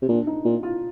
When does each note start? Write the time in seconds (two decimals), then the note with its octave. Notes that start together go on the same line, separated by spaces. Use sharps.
0.02 C3
0.09 A#2 D4
0.27 D#4
0.45 A#2 F4
0.63 F4